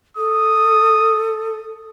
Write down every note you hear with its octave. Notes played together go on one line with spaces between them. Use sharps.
A4 D#6